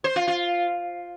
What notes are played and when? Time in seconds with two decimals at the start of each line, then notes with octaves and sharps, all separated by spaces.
0.04 C5
0.16 F4
0.27 F4